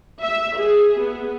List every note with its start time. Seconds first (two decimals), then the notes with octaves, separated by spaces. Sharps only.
0.20 E5
0.57 G#4
0.99 B3